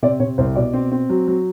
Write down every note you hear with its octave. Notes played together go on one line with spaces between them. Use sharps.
C3 D5
C3 C#5
C2 C5
B2 D5
C4
C4
F#3
F#3